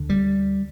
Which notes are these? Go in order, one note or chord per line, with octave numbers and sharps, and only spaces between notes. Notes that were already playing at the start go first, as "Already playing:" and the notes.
Already playing: D2 D3
G3